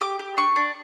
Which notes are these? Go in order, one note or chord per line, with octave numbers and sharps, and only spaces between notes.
G4 D6
G4
D4 C#6
D4